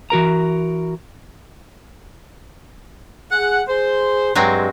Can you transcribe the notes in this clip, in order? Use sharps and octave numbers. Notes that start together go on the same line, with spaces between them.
E3 F#4 A#4 A#5
G#4 F#5
G#4 C5
G2 F#3 G#3 C4